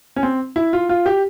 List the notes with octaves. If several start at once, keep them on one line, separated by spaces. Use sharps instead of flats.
C#4
C4
E4
F4
F4
G4